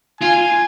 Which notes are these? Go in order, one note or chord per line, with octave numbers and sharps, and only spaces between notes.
F4 G#5